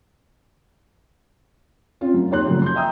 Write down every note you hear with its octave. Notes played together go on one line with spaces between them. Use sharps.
C4 C#4 F4
F#2
D#2 D#3 C#5 C6 F#6
F#2 A#2 C#3 F3
C6 G6
D#5 E5 G5 A#5 D#6 E6